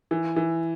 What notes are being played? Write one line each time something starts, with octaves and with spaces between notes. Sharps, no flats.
E3
E3